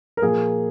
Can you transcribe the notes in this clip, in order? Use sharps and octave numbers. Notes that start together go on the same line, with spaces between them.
A#4
A#2 F3 A#3 G#4